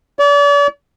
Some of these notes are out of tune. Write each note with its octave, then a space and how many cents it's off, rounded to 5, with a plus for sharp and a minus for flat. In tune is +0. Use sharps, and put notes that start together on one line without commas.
D5 -40